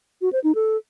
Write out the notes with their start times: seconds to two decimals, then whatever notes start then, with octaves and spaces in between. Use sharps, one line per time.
0.21 F#4
0.33 C5
0.44 D#4
0.55 A4